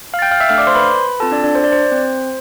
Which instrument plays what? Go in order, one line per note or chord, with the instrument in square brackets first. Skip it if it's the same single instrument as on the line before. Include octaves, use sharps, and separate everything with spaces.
[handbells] F5 F6
A6
G5 G6
F5 F6
E5 E6
A3 D4 A4 F5 F6
D5 D6
C5 C6
B4 B5
C4 F4 A4 A5
D4 D5
D4 D5
C5
D5
C5
C4